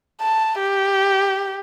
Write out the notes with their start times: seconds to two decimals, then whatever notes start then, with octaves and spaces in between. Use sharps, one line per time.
0.21 A5
0.59 G4